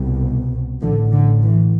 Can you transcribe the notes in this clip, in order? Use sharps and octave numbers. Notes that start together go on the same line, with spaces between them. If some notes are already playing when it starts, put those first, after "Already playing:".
Already playing: C2 B2
A1 A2 D3 F3
D3
E3